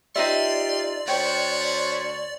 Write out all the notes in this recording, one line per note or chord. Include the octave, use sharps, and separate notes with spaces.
D#4 F4 G4 C5 D5 E5 C6
D2 B3 C5 C#5 G5